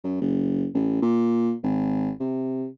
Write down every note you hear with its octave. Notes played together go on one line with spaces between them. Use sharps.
F#2
F#1
A1
A#2
G#1
C3